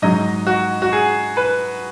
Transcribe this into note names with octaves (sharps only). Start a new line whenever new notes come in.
G#2 F#3 D#5
F#4
F#4
G#4
B4